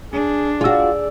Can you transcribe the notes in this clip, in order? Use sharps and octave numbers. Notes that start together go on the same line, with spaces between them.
D4 G#4
F4 F#4 G#4 D5 E6